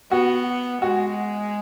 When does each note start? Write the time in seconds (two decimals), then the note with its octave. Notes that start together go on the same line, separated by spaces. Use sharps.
0.11 B3 F#4
0.82 G#3 F#4